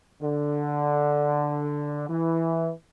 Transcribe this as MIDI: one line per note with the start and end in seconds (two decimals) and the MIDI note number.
0.22 2.06 50
2.10 2.72 52